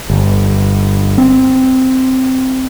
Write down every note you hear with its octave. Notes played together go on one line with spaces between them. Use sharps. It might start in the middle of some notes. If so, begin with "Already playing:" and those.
G1
C4